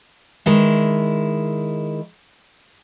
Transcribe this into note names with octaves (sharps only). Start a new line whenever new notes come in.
D#3 G#3 E4